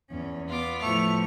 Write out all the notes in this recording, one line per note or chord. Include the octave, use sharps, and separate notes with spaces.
E2 C#4
B3 F4 D6
A2 F3 A3 C#7 F7